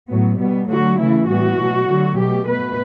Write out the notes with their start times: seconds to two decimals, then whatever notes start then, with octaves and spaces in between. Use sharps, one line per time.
0.09 A2 F#3 B3
0.39 B2 G3 B3
0.68 D3 F#3 A3 F#4
0.98 C#3 E3 A3 E4
1.28 A2 E3 G3 B3 F#4
1.57 B2 F#3 A3
1.87 D3 F#3 A3
2.16 B2 A3 G4
2.46 B2 A3 B4